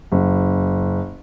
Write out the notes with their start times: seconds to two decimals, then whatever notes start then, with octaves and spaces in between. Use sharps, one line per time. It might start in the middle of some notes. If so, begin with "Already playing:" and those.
0.12 F#1